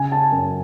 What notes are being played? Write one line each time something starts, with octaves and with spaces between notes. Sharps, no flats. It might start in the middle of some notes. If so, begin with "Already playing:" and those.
Already playing: C#3 G#5
A5
F#2